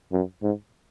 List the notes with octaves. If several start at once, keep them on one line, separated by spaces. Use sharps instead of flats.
F#2
G#2